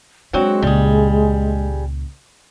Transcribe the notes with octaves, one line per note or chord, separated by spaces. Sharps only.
F#3 G#3 C4 D4 F#5
C#2 A#2 G3 G#4